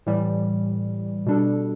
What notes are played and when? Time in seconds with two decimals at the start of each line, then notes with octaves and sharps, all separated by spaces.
0.06 A2 E3 G3
1.26 B2 G3 D4 A4